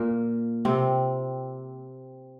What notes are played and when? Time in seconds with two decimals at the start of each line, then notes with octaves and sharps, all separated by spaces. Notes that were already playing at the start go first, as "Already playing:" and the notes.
Already playing: A#2 A#3
0.65 C3 C4